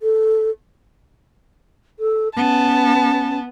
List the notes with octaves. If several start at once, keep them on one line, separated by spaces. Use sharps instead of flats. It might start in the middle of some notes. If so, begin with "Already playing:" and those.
A4
A4
B3 C#4 A5